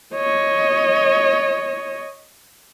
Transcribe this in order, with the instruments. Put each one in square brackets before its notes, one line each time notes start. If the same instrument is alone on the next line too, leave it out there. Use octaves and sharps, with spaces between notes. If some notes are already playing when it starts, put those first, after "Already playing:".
[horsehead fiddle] C#5 D#5